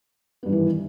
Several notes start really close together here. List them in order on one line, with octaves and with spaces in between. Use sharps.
B3 G2 D#3 E3